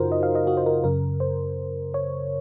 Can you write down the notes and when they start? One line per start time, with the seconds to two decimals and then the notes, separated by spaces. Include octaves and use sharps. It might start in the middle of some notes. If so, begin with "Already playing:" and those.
Already playing: F#2 C#3 D#4 F4 F#4 A#4 C5
0.12 D#5
0.23 F5
0.35 D#5
0.47 F#4
0.57 C5
0.66 A#4
0.84 F#2 C#3 A#4
1.20 C5
1.94 C#5